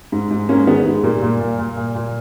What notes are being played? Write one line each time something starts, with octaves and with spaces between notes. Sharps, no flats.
G#2
G#2
G#2 A#3 C#4
D#3 G#3 B3
G#2 G#3
A#2 G3 A#3
A#2
A#2
A#2
A#2
A#2